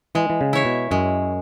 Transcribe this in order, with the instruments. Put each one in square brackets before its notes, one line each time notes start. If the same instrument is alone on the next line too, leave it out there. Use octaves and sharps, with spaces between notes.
[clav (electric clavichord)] E3 [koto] G#3
[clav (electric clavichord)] E3
C#3
[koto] E4 C#5 E5
[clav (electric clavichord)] B2
[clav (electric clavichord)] F#2 [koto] G#3